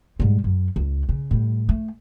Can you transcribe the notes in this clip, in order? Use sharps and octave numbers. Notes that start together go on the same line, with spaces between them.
G#2 G3
F#2
C#2
C#3
A2 G3
A3